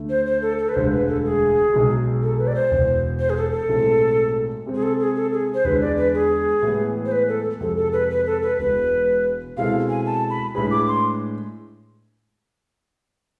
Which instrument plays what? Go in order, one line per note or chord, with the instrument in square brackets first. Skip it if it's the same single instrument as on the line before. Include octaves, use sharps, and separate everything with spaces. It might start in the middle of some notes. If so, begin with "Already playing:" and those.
Already playing: [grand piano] D2 D3 A3
[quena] C5
C5
A4
A4
B4
[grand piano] E1 D2 D3 G#3 [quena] C5
[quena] B4
A4
G#4
[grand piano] B1 B2 G#3
[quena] A4
B4
D5
C5
[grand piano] E1 E2 B2
[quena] C5
G#4
A4
A4
[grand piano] B1 A2 G#3 C4
C3 G#3 C4
[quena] G#4
A4
G#4
A4
G#4
C5
[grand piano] E2 D3 G#3 [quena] B4
[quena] D5
B4
G#4
[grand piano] A2 E3 G#3 B3
[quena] C5
B4
A4
[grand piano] F2 C3 G#3 [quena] A4
[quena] A4
B4
B4
A4
B4
[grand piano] E1 E2 B2 G#3 [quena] B4
[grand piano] B2 G#3 C4 E4 A4 [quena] F5
[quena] G#5
A5
B5
[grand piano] A2 G#3 D4 G#4 B4 [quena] B5
[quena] D6
C6